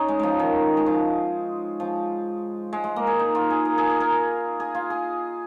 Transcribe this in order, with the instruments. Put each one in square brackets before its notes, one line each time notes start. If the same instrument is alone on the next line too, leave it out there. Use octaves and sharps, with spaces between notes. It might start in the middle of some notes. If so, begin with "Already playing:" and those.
Already playing: [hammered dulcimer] C#4 D#4
G#3
F3 G#3
D#3
G#3
F3
F3
G#3
G#3
A#3
G#4
D#4
F4
G#4
A#4
G#4
G#4
A#4
G#4
F4
G#4